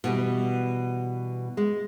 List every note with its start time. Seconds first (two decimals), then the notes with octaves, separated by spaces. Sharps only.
0.04 B2 E3 G3
1.57 G#3